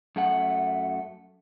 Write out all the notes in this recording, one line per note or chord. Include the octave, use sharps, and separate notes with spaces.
F#2 A3 F#5